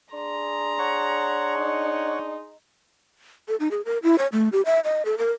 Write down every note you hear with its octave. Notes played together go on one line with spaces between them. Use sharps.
D4 G#4 A#5 C6
C#5 F#5 C#6
D#4
A4
D#4
G#4
A#4
E4
C#5
A3
G4
E5
D#5
A4
A#4